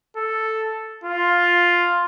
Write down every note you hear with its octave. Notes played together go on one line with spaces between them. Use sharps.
A4
F4